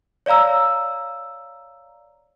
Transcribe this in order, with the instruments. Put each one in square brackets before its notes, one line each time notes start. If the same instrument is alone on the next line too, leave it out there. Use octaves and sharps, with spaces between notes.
[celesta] C#5 D5 F5 A#5 E6